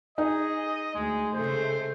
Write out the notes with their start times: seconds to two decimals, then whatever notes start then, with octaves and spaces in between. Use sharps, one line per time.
0.18 D#4 G#4 D#5
0.95 D2 G#3 G#4
1.35 C#3 G#3 A3 C5